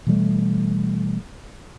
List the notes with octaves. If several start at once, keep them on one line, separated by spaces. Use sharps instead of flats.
B2 E3 G3 A3